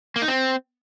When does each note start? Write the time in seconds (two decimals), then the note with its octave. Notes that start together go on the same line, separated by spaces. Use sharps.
0.16 A#3
0.22 D#4
0.28 C4